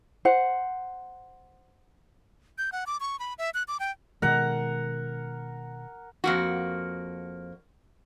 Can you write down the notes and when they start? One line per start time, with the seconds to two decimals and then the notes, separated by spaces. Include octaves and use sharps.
0.25 C5 F#5
2.58 G6
2.72 F#5
2.87 D6
3.00 C#6
3.19 B5
3.38 E5
3.54 F#6
3.68 D6
3.80 G5
4.22 B2 D#3 G#3 A#4 F#5
6.24 F2 A#3 F#4